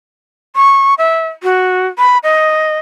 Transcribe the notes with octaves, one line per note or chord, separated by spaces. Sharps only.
C#6
E5
F#4
B5
D#5